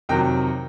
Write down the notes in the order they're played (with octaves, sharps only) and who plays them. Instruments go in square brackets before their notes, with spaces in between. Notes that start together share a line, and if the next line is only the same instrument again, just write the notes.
[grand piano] F2 C3 D#3 F#3 G5